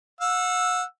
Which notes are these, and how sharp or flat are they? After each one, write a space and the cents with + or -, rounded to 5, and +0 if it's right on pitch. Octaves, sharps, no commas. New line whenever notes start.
F#5 -35 E6 +0